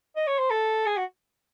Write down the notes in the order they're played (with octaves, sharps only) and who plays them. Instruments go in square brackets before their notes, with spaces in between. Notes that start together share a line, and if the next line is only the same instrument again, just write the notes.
[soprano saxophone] D#5
C#5
C5
A4
G#4
F#4